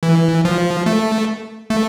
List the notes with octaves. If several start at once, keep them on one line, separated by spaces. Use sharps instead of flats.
E3
F3
A3
A3